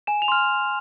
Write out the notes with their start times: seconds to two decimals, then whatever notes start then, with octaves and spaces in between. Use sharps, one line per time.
0.07 G#5 E7
0.22 F7
0.28 C6 F6